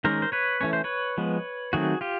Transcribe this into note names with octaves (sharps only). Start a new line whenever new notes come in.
D#3 G#3 C#4 A#4 C5
C5
B4 C#5
E3 A3 C#4 C#5
C5
B4 C#5
F3 G#3 B3
D#3 F#3 A3 C4 F#4 G#4
F4 G4